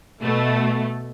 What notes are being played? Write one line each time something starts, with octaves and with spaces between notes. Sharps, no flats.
B2 A3